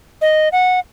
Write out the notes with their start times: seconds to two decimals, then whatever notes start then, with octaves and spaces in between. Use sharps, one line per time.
0.21 D#5
0.52 F#5